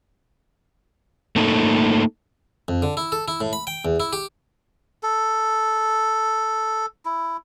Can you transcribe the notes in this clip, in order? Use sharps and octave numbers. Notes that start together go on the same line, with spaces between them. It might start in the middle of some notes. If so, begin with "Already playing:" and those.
A3 A#3 D#4 A4
F2
D3
E4
A4
E4
A2
B5
G5
E2
E4
G4
A4
E4